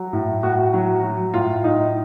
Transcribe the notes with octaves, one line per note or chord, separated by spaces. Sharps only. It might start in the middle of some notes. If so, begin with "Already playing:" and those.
Already playing: F#3
A2
A2 F#4
F#3
F#3
A2 F4
A2 D#4